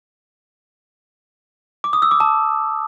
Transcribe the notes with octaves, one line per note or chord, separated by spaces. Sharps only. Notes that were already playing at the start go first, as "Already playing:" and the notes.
D6
D#6
E6
D6
A5